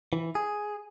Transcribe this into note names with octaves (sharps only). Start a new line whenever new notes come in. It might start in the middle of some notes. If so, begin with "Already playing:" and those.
E3
G#4